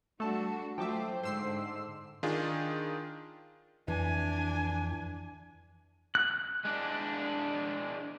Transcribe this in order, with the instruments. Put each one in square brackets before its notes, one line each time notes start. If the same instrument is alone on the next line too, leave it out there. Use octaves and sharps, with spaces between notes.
[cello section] G3 D4 F#4 [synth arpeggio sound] A3 [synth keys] A4 A5
[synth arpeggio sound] F3 F#3 E5 [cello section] A3 C5 [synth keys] G5 A5 D6
[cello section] G#2 D3 [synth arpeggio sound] C5 E6 C7
[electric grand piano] D#3 D4 F4 G#4
[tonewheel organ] F2 [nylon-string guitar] E3 [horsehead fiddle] D4 G#5
[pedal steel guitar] F#6
[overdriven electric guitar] G#3 D4